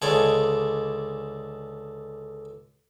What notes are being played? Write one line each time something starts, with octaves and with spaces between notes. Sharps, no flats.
C#2 D3 D4 D#4 C#5 G#5